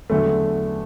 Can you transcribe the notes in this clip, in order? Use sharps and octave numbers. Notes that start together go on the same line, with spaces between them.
E2 D3 F#3 A3